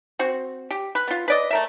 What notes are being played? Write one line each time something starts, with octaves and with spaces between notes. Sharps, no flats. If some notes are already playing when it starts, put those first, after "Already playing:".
C4 F#4
G4
B4
B3 F4
B4 D5 D#5
A3 A#4 E5